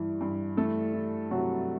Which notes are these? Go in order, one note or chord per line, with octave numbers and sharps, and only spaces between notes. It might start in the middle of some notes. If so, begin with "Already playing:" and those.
Already playing: G2 E3
G2
E3 A3 A4
E3
C3 F#3 F#4